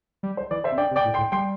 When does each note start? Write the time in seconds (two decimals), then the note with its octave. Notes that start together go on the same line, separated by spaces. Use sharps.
0.23 G3
0.37 C5
0.51 E3 D5
0.64 C5 E5
0.72 C3
0.78 D3 D5 G5
0.91 C3
0.96 D5 G5
1.05 A2
1.14 G5 C6
1.18 A2
1.32 G3 G5 C6